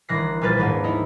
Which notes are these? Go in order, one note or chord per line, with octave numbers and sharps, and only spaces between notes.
G1 D#3 E3 F#6 A#6 C7
A#1 G3 F4 G#4 B4 A6
D#2 G#2 A#3 D4 B4
D#4 E4